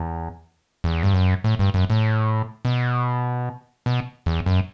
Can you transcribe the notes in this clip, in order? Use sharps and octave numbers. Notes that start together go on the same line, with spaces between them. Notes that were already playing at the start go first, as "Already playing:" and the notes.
Already playing: E2
E2
G2
F#2
A2
G2
F#2
A2
B2
B2
E2
F#2